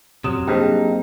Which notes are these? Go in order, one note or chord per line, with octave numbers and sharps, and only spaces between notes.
F2 A2 C3 F#3 D#6 F6 E7
G2 F#3 A#3 C4 D#4 G#4 C5 G5